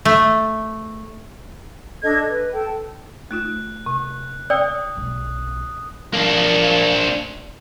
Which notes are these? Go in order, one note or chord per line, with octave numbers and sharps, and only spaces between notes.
A3
D4 A4 D#5 G#6
B4
A4 G5
A3 D#4 F4 F#6
C3
D5 G5 D#6 E6
B1
A#3 D4